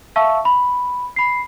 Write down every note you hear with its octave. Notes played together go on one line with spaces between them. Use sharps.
E5 F5 A5 C#6 E6
B5
B5 C7